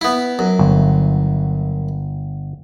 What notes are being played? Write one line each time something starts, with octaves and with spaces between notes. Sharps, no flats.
B3 E4
F#2
G1